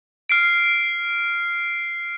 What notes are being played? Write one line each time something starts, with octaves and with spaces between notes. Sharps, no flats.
F6 C7 D7